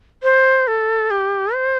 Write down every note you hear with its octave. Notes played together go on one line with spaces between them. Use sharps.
C5
A4
G4
C5